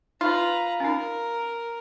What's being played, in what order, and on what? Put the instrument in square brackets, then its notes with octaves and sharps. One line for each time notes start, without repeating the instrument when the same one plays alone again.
[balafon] D#4 [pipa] F4 [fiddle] B4 A#5
[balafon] C#4 D#4 [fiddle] A#4